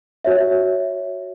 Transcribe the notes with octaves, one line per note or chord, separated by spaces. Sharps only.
F#4 C#5 E5